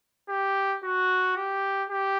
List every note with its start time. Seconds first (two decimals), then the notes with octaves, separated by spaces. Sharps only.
0.29 G4
0.84 F#4
1.36 G4
1.89 G4